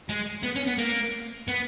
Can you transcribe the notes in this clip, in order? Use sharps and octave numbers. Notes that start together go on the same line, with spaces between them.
G#3
B3
C#4
B3
A#3
B3